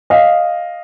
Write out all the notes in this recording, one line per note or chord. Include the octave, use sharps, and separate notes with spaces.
D#5 F5